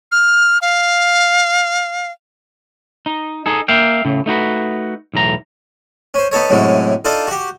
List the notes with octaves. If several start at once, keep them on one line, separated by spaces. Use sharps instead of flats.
F6
F5
D#4
D#4 G#4 A4
A#3 E5 F5 G5
A2 C#3
A3 D#4 F#4 B4
B1 E2 A2 A#5
C#4 C5
B3 D#4 A4 C#5
F#2 A2 C3 F#3 G#3
D4 D#4 F4 A4
F#4 G4